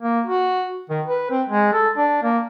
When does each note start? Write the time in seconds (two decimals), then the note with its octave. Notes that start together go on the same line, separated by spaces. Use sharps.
0.03 A#3
0.26 F#4
0.90 D#3
1.06 B4
1.30 C4
1.49 G#3
1.73 A4
1.97 D4
2.23 A#3